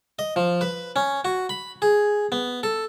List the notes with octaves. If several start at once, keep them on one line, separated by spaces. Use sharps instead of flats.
D#5
F3
B4
C#4
F#4
B5
G#4
B3
A4